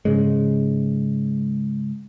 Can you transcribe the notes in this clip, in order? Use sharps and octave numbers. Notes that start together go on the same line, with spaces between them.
G#2 C#3 G#3